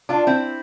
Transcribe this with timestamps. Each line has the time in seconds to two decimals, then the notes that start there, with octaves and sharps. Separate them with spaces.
0.09 D4 F4
0.27 C4 E4